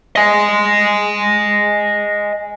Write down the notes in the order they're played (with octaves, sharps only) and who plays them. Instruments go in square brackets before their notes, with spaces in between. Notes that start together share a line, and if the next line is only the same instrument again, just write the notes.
[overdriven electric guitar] D#5 G#5